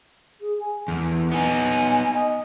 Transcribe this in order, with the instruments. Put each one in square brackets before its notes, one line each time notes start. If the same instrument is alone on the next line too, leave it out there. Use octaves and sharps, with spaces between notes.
[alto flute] G#4
G#5
[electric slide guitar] E2 [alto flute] A4
[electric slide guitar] B3 D#4 [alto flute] G#5
[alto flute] D#5